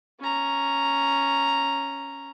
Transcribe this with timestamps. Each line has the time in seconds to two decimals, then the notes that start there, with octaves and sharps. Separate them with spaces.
0.20 C#4 A#5